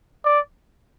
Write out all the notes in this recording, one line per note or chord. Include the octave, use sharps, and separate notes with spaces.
D5